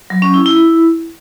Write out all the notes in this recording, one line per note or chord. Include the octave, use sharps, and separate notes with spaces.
F#3
C#4
E4
E4